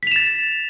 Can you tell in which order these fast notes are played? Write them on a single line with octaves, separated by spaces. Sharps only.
B6 F7 E7 A6